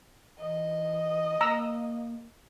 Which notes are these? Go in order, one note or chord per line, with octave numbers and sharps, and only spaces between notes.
E3 D#5
A#3 A#5 E6